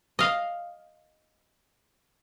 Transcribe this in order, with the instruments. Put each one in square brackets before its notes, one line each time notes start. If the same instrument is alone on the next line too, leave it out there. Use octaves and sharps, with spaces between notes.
[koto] D#5 F5